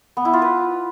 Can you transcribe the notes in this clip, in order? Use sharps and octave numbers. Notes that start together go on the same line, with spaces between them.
B3
E4
F4
B4